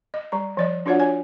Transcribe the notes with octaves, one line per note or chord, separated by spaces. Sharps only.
D#5
G3 A#5
F3 D5 D#5
D4 F4 F#4 C#5 D5 F#5
C#5 G#5